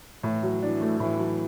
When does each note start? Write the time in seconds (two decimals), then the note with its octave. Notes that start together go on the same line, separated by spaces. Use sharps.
0.23 A2 E3
0.43 F#3
0.62 E3 D4
0.81 A3
1.00 A2 E3
1.19 F#3